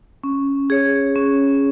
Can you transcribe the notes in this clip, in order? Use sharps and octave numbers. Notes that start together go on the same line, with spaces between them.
C#4
G#4 C#5
C#4